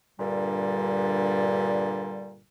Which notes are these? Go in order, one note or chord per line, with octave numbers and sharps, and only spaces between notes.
G2 A#2 D3 G3